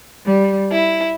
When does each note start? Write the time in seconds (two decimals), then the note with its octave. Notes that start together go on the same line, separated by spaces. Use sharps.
0.25 G3
0.71 E4